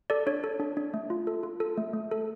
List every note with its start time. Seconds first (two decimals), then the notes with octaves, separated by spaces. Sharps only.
0.10 A4 D5
0.27 D4 C#5
0.44 A4
0.60 D4
0.77 D4
0.94 A3
1.10 F4
1.27 A4
1.43 F4
1.60 A4
1.78 A3
1.93 A3
2.11 A4